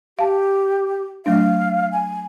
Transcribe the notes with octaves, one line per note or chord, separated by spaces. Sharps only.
G4 F5 A5
F#3 A3 D4 F5
G#5